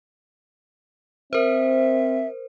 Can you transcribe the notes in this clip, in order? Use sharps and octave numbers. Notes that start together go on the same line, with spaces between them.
C4 A#4 C5 E5